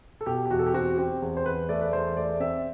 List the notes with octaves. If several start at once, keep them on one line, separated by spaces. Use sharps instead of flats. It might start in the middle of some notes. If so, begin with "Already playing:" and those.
A4
B2 G4
G4
E2 F#4
A4
G4
C4 F#4
C4 G4
E2
C5
E2 B4
A3 D5
B4
E2 C5
A3 D5
C4 E5